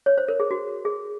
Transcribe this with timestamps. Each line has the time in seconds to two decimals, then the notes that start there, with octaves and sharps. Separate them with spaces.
0.06 C#5
0.18 C5
0.28 A#4
0.40 G#4
0.51 F#4
0.85 G#4